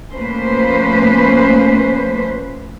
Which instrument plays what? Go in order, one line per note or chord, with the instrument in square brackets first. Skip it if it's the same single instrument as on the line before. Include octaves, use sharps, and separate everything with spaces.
[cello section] F3 A3 A#3 C#4 B4 C5